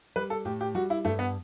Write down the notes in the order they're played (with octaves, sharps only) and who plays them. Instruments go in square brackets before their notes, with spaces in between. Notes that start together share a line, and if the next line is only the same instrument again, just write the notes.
[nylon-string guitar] G3 [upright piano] B4
[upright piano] A4
[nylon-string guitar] A2 [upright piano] G4
[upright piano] G4
[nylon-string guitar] G3 [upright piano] F#4
[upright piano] E4
[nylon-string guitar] G2 [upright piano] A3
[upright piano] B3